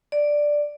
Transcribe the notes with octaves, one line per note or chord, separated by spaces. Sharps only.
D5